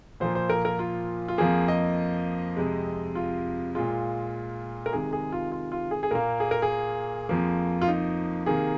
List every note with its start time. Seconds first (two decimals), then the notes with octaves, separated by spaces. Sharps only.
0.20 A#2 F3 A#3 C5
0.35 C5
0.50 A#4
0.65 A#4
0.79 F4
1.28 F4
1.38 F2 F3 A#3 G#4
1.68 D#5
2.57 F2 C3 G#3
3.15 F4
3.75 A#2 G#3 F4
4.86 A#4
4.93 C3 D#3 G#3 G#4
5.13 G#4
5.32 F4
5.52 F4
5.72 F4
5.91 G#4
6.03 G#4
6.11 A#2 A#3 A#4
6.40 G#4
6.51 A#4
6.62 G#4
7.29 F2 F3 A#3
7.82 F4
7.88 D#4
8.46 C3 D#3 A#3 G#4